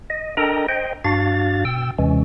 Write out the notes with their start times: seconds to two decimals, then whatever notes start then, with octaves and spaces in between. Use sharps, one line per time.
0.10 D#5
0.37 D4 A4 A#4 D#5 G5 A#5
0.69 C5 D#5 G5
1.05 G2 D4 F#4 F5 A6
1.65 B2 G5 E6
1.98 D#2 C3 E3 G#3 C#4